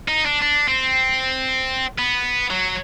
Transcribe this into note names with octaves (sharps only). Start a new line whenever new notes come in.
D#4
D4
D4
C4
B3
F#3